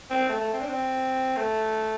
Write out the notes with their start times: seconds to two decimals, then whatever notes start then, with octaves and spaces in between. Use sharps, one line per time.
0.11 C4
0.29 A3
0.41 A3
0.53 C4
0.61 D4
0.69 C4
1.37 A3